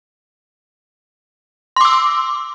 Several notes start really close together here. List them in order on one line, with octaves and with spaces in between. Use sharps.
C6 D6 E6